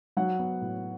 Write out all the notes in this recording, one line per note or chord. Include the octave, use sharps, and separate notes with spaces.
F#3 F#5
B3
A2